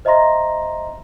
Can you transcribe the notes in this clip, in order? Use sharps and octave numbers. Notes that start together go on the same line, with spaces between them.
C5 D#5 E5 A#5 C6 A#6